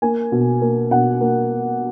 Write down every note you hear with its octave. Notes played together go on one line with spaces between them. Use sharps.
A#3 G#5
B2
A#3
B2 F#5
A#3